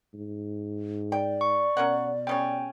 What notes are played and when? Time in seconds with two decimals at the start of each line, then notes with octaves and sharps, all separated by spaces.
0.14 G#2
1.12 D5 G5
1.41 C#6
1.77 B2 C#4 A#4 F#5
2.27 C#3 G3 C#4 G5